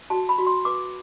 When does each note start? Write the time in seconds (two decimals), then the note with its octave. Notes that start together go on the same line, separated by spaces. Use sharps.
0.10 F#4 A5
0.29 B5
0.38 F#4
0.47 C6
0.65 B4 D6